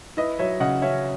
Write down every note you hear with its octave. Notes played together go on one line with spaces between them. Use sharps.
E4 B4 D#5
F#3 C#5 E5
C#3 D#5 F#5
C#4 C#5 E5